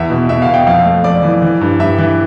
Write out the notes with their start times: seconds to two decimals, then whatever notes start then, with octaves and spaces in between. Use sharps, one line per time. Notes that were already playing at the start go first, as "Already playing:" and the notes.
Already playing: E2 E5
0.10 B2
0.29 B2 E5
0.42 F5
0.48 B2
0.54 G5
0.66 F2 F5
0.85 A3
1.04 F2 D5
1.23 E3
1.42 E3
1.61 G2
1.80 G2 E5
1.98 E3